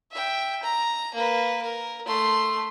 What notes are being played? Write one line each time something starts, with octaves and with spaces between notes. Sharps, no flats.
E5 G5
A#5
A#3 B4
A#4
A3 C6